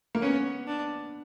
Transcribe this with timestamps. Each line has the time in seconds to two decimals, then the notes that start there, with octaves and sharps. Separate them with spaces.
0.15 A#3
0.22 B3 C#4
0.67 D4